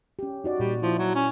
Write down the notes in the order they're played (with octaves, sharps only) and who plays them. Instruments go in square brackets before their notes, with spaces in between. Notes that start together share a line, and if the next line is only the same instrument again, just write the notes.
[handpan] C#4 G4
D#4 F#4 D5
[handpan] A#2 [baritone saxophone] G3
[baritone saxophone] F3 [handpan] E4
[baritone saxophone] F#3
C#4